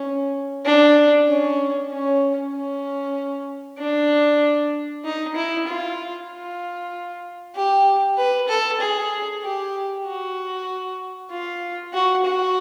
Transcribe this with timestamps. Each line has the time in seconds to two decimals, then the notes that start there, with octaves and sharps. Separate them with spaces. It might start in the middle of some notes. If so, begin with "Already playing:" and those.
Already playing: C#4
0.66 D4
1.28 C#4
1.91 C#4
2.53 C#4
3.79 D4
5.05 D#4
5.36 E4
5.67 F4
6.30 F4
7.55 G4
8.18 B4
8.49 A4
8.80 G#4
9.43 G4
10.05 F#4
11.31 F4
11.94 F#4
12.25 F#4